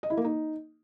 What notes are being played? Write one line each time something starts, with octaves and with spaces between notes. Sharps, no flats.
D#5
E4
A#3
D#4